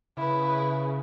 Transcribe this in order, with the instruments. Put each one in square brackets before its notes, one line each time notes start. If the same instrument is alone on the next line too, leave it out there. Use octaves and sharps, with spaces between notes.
[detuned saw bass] C#3 [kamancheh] E4 B4